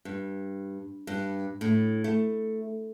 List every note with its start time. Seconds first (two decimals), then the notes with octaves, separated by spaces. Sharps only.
0.05 G2
1.07 G2
1.61 A2
2.04 A3